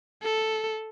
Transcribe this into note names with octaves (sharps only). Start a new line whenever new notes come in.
A4